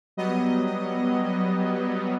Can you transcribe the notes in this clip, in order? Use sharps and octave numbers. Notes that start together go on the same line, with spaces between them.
F#3 G3 B3 D#5